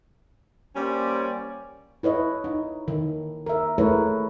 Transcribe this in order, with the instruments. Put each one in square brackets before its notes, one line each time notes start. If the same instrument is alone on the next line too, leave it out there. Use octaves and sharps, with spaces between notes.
[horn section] G3 A#3 C#4 C5 D5
[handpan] E4 B4 C#5 D#5
D#4
D#3
A#4 E5
A3 E4 G#4 A#4 B4 C#5